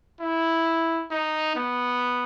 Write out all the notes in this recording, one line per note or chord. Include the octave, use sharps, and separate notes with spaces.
E4
D#4
B3